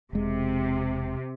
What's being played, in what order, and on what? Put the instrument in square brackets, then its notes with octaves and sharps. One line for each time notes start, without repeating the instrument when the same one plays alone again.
[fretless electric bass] E1 G#3 [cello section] C3